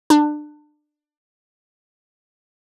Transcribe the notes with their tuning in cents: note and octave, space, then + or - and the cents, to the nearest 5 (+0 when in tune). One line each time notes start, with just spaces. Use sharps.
D4 +25